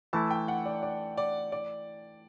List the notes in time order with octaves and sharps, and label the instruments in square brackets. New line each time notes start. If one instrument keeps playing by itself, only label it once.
[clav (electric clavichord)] E3 A3 E4 [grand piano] A5
[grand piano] G5
F#5
D5
D5
D5
D5